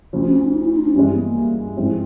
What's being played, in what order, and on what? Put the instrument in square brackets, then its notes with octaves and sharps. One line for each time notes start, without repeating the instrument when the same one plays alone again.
[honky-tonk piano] D2 C#3 F3
[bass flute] C#4
C#4
D4
D#4
E4
D#4
D4
[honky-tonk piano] G2 [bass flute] C#4
[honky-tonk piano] E3 G#3
[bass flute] B3
A#3
[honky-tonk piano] G#2 F3 G#3 C4 E4